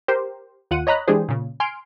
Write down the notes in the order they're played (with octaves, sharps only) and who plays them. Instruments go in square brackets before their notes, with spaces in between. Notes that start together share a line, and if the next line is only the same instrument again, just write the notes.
[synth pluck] G4 A#4 C5
D#2 F4 F#5 D#7
C#5 D#5 A#5 B5 F#6
E3 G#3 D4 G4 G#4 C5
A#2 C#3
G#5 C6 F6 D7